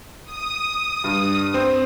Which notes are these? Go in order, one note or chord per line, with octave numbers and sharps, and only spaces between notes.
D#6
G2
C4